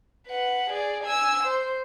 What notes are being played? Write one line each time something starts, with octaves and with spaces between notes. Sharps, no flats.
B4 F#5
G#4 D5
G#5 E6
C5